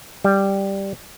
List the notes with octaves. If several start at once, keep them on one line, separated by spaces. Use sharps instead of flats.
G3